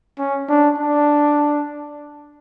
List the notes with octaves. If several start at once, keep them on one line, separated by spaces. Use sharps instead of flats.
C#4
D4
D4